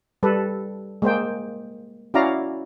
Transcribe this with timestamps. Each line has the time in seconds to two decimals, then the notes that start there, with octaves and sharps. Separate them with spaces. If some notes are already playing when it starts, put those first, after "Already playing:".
0.23 G3 A4 B4
1.02 G#3 A#3 C5 G5
2.14 C#4 E4 F#4 D5 F5 A#5